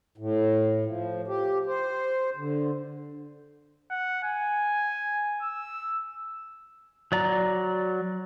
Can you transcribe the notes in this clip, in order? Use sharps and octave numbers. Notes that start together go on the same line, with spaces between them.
A2
F3
G4
C5
D3
F#5
G#5
E6
F#3 D5 A#5